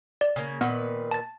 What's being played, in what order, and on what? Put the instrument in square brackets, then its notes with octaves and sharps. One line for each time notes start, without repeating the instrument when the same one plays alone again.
[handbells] D5
[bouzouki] C#3 A#3
[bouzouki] A#2 D#3 B4 [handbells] B3
[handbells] A5 A6